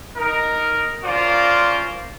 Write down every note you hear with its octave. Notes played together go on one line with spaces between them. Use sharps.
D#4 A#4
C#4 F4 A#4 C5 D5